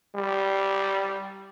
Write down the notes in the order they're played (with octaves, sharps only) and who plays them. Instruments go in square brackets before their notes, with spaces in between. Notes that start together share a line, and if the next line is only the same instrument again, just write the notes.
[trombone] G3